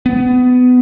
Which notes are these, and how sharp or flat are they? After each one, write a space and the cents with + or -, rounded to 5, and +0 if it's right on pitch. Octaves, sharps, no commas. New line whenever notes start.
B3 +20